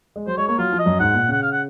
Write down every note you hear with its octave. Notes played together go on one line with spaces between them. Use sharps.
G#3
F#3 C5
G#3 C#5
A#3 C#5
F#3 F4
F3
D#5
F#2
G#2 F#5
A#2
C#3 F#5
F5
F#5